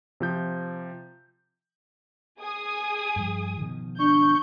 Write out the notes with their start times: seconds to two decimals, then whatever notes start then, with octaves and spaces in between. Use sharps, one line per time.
0.20 C3 F3 G6
2.40 G#4 G#5 D#6
3.16 G2 F3
3.57 B2 D#3 F3
3.99 D4 C#6 G6